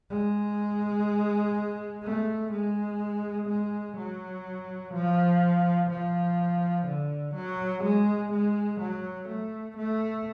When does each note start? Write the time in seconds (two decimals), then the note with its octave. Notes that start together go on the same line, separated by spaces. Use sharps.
0.11 G#3
2.04 A3
2.52 G#3
3.49 G#3
3.97 F#3
4.94 F3
5.90 F3
6.87 D3
7.35 F#3
7.83 G#3
8.32 G#3
8.80 F#3
9.28 A3
9.77 A3